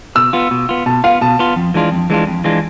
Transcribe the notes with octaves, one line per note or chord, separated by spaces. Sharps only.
B2 E6
B3 F4
B2
B3 F4
B2 A5
B3 F4 F5
B2 A5
B3 F4
F2
E3 G#3 D4 F4
F2
E3 G#3 D4 F4
F2
E3 G#3 D4 F4